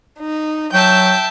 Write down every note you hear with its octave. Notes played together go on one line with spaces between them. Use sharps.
D#4
F#3 E5 G5 A5 G6